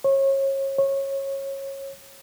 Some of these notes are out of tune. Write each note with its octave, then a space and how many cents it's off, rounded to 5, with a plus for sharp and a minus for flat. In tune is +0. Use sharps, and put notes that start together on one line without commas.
C#5 -30
C#5 -20